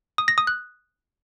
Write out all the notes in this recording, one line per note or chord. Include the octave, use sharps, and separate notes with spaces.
D#6
A#6
D#6
F#6